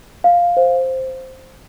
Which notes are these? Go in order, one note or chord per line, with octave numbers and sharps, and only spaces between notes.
F5
C5